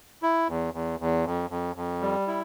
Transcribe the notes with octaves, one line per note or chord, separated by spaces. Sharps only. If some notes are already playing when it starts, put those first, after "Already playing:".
E4
E2
E2
E2
F2
F2
F2
G3
E4